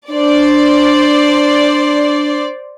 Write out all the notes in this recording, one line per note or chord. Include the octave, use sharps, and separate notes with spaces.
D4 C5 D5